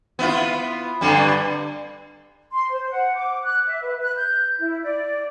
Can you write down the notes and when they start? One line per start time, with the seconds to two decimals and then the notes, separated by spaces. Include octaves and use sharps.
0.19 B3 E4 F4
1.01 G2 D3 G3
2.51 C6
2.71 C5
2.90 F#5
3.15 D6
3.44 F#6
3.67 E5
3.83 B4
4.01 F#6
4.16 G6
4.59 E4
4.83 D5